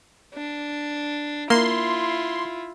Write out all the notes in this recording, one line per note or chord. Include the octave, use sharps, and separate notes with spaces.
D4
A#3 E4 F4 C6